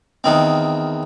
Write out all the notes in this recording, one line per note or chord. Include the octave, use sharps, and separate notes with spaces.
E2 D#3 C4